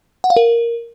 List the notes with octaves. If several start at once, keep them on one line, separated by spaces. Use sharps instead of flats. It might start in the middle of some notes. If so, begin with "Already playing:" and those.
F#5
F5
A#4